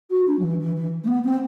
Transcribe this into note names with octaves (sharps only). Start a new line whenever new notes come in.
F#4
D4
F#3
E3
E3
E3
A3
B3
C4